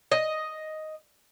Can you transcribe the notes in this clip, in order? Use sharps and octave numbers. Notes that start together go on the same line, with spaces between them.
D#5